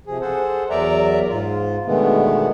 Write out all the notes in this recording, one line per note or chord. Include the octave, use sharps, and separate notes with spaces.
C3 F3 G#4
G#4 A4 C5 F#5
E2 F#3 A#4 D5 E5 A#5
G#2 F4
B2 D3 D#3 G#3 A3 B3